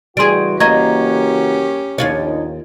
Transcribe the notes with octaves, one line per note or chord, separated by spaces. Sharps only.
C#3 E3 G3 F#4 G#4 C6 D7
A#3 C#4 G4 D#5 A#5 C#6 G#6
A#1 D#2 D#4 F4 C#5